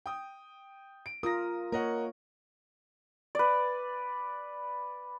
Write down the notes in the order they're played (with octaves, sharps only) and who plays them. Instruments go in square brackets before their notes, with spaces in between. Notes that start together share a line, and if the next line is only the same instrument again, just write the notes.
[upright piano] G5 D#6
D7
[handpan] F4 A#4 [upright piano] D#6 A#6
[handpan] A#3 C#5 [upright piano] A#4 D#5 F#5
[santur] B4 D5